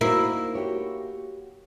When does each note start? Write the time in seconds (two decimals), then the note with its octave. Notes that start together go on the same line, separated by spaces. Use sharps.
0.01 A#3 D#4 E4 F#4 C5
0.55 F#4 G4 C#5